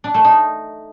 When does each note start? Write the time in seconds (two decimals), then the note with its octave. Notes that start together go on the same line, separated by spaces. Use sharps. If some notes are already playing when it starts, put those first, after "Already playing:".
0.04 D4
0.14 A3
0.25 D#4